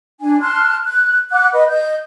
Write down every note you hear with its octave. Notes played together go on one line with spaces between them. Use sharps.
D4 G#5
A5 C6 F6 F#6
F#6
F#5 D6 F#6
B4 D#5
D#5 G6